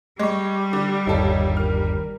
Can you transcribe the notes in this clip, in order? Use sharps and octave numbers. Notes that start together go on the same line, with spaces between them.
G3 G#3 C#6 D6
D3
G1 D#2 D#4 A4 C#5
A#4 F6